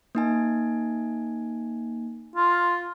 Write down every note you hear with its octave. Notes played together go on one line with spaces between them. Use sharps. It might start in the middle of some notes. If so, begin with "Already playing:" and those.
A#3 D#4 G#5
F4